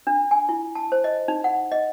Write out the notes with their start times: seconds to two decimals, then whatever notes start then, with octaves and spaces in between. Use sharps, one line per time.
0.07 D4
0.31 G#5
0.49 E4
0.75 A5
0.92 C5
1.04 D#5
1.28 D#4
1.44 F#5
1.72 D#5